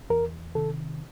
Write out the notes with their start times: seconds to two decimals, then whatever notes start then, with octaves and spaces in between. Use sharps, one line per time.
0.10 E2 A#4
0.55 C3 D#3 A4